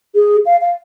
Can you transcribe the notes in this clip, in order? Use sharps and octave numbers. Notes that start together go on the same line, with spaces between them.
G#4
F5
F5